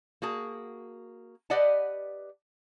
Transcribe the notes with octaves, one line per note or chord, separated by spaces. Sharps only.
A#3 F#4 G#4 A5
G4 B4 D5 D#5 F#5 A5